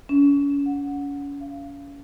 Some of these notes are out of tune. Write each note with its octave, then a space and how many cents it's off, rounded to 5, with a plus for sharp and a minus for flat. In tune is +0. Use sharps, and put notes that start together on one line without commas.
C#4 +35
F#5 -15
F5 -20